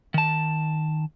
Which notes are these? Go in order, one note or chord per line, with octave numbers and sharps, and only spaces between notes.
D#3 A5